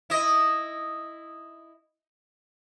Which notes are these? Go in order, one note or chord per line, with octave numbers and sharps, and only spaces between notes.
E4 D#5